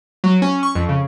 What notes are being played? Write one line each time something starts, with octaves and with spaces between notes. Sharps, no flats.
F#3
C#4
C#6
F2
C#3